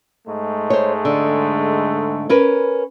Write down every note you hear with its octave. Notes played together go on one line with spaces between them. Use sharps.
G#2 G#3 A3
C5 C#5
D3
C#4 A#4 B4